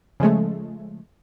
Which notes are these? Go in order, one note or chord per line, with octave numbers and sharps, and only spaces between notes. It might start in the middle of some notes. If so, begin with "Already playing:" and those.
C#3 F3 G#3 A3